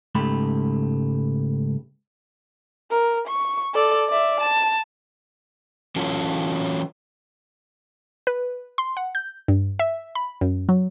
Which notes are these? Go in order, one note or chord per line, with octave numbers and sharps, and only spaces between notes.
C#2 G#2 A3 G4 B5
A#4
C#6
A4 D5
D5 E5
A5
E3 F#3 C#4 F4 A4 C#5
B4
C6
F#5
G6
G2
E5
B5
F#2
F#3